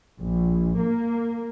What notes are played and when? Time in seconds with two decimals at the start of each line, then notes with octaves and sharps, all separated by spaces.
0.20 A#1
0.80 A#3